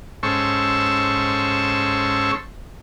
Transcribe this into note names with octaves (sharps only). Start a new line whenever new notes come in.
G#2 C#4 A4 C5 C#6 E6